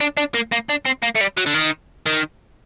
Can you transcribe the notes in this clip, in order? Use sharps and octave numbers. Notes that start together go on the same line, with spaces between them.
D4
D4
A#3
A#3
D4
C4
A#3
A3
G3
F#3
D3
D#3
D#3